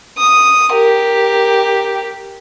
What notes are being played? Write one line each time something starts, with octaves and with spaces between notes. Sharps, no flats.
D#6
G4 A#4